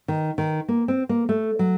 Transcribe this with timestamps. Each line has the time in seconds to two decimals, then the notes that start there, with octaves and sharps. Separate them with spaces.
0.08 D#3
0.38 D#3
0.68 A#3
0.88 C4
1.09 A#3
1.29 A3
1.59 F#3